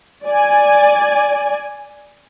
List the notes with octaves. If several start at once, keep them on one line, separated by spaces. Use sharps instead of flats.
D5 G#5